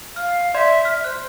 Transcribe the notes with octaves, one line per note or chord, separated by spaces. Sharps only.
F5 F6
D5 E5 C6 G#6
F6
C5 F#6